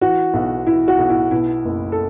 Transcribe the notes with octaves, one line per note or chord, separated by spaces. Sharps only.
E3 F#4
B1
E3 E4
F#4
B1
E4
B2 E4
F#1
A4